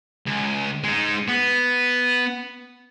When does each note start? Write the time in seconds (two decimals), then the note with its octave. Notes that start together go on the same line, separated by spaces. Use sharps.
0.26 C#2
0.84 G#3 D#4
1.29 B3